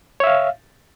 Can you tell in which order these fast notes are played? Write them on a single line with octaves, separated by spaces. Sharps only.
C#5 E5 F5